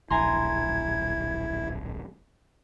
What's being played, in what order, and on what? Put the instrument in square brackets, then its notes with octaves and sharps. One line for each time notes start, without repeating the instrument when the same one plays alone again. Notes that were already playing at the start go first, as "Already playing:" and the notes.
[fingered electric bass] D1 A#1 [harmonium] E4 [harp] G#5 A#5 C6 [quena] G#6